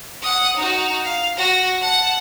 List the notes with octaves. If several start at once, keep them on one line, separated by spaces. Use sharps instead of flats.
F#5 D#6
D#4 F#4
F5
F#4 A#6
F#5 A5